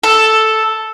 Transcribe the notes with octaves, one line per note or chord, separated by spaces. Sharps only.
A4